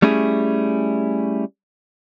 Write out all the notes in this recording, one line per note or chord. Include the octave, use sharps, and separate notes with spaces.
G3 A3 C#4 E4 G#4